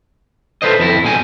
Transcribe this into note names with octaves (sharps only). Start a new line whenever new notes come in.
F4 A4 B4 C5 D#5
F2 E4
B2 G3 G#5